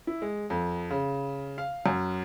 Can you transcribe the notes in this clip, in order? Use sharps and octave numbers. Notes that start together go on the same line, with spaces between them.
E4
G#3
F2
C#3
F5
F#2